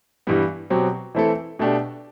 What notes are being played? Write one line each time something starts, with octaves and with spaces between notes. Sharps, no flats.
G2 E3 G3 B3
B2 F#3 C4 G4
E3 A3 C4 E4 A4
B2 A3 D4 G4